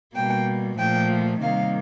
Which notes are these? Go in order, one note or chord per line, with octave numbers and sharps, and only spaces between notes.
B2 G3 A#3 G5
A#2 F3 A3 G5
C3 D#3 G3 A#3 F5